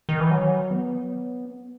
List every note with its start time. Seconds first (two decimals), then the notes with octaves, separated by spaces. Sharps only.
0.09 D#3
0.20 E3
0.31 F#3
0.71 B3